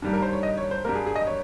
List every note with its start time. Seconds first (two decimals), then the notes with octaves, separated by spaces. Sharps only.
0.02 G2 D#3 G3 A#3
0.13 A#4
0.22 C5
0.33 C#5
0.43 D#5
0.58 C#5
0.71 C5
0.85 G2 G3 A#3 A#4
0.95 G#4
1.06 G#4
1.16 D#5
1.27 C#5